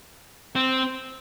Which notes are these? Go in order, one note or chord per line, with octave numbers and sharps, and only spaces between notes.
C4